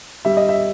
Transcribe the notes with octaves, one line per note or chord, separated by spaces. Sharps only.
G3 E5
D#5
E5